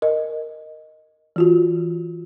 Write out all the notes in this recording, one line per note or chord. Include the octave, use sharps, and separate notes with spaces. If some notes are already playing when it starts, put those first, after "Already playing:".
A#4 D#5
E3 F4 F#4